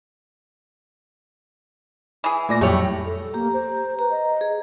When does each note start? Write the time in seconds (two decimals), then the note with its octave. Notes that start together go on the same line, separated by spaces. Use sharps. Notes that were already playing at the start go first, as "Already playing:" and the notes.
2.24 E3 G#4
2.49 A#2 A3 D5 G#5 A#6
2.61 F2 A2 F#3 G3 A3 C#5 G5
3.06 A4
3.34 A#3 G4 A#5
3.53 C5
3.99 B4 A#5
4.11 D#5
4.41 G#4